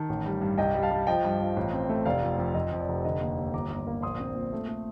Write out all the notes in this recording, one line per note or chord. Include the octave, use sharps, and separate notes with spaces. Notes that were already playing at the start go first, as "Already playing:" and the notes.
Already playing: D#3 A5
A1
G3
G2
C2 D#5 G5
G3
F5 A5
G3
F3 D#5 G5
G2
F3
A1
C4
A3
F1 D5 F5
F2
F2
F2 D#5
F2
D5
F1
D3 D#5
D#2
D#2
G1 A#5 D6
G1
A#3
A#1 C6 D#6
C4
A#2
A3
A3